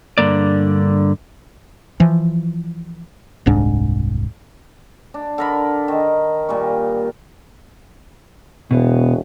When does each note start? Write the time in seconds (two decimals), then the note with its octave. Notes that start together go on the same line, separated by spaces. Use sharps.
0.18 G2 D3 A#3 D5
2.00 E3 F3
3.46 D#1 C2 G#2 D4
5.14 D4
5.38 D3 A#4 B5
5.88 D#3
6.49 A#2 G3 C#6
8.71 E1 B2 B3